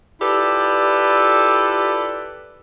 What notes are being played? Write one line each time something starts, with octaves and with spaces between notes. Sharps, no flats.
E4 F4 G4 A4 B4 D5